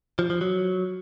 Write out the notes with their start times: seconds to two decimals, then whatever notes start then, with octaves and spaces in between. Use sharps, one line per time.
0.19 F3
0.30 F3
0.41 F#3